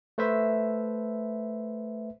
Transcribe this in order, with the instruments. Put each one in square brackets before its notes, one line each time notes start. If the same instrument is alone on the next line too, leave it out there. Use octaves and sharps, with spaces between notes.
[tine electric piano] A3 B4 C5 E5